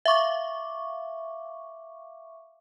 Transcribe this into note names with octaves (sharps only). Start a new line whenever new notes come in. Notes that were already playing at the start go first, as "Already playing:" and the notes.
E5 F5 C#6 D6